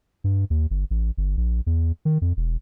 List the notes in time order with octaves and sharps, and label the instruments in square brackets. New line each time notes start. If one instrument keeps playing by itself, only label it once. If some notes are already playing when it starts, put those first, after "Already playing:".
[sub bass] G2
D#2
G1
A1
G1
A#1
E2
D#3
F2
E1